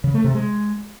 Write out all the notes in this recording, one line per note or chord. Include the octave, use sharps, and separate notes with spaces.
C#3
A3
C3
G#3